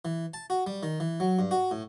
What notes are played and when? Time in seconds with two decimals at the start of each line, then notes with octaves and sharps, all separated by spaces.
0.05 E3
0.34 A5
0.50 F#4
0.67 G3
0.83 D#3
1.00 E3
1.20 F#3
1.39 G2
1.51 F#4
1.71 A2